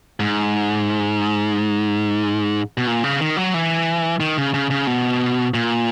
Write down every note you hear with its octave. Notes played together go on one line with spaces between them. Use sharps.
G#2
B2
A#2
C#3
D#3
F#3
E3
D#3
C#3
C#3
C#3
B2
A#2